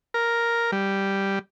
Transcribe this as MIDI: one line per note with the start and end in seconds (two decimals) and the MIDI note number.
0.14 0.71 70
0.72 1.39 55